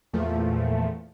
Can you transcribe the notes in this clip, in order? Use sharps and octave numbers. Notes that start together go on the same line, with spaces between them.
E2 A#2 F3 A3